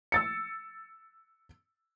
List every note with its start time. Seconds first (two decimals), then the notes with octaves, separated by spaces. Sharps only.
0.12 E6 A6 C#7